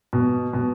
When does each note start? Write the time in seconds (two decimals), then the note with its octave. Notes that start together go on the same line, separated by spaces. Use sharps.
0.13 B2
0.53 B2